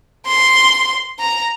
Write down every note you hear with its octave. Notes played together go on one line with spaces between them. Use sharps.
C6
A#5